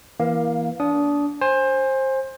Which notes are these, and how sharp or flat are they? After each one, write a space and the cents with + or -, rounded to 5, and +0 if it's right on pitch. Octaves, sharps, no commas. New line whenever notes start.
E3 +0 A#3 +25 F5 +0
D4 -25 D#6 +0
C5 +20 G#5 -15